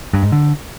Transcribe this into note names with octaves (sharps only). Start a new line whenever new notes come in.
G2
G#2
D3